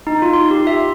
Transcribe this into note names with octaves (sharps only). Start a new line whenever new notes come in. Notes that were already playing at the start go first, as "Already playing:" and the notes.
D#4
F4
C6
G4
E5